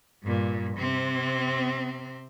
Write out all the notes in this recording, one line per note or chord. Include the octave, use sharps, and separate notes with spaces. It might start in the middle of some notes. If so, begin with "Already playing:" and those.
G2 A#2
C3 C4